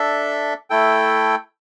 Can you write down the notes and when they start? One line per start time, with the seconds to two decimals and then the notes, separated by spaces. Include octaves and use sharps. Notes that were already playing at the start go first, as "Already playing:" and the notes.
Already playing: D4 A4 E5
0.70 A3 E4 A4 G5